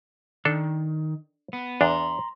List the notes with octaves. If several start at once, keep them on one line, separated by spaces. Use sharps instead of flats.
D#3 D4 A4
B3
E2 D4 A#5 C6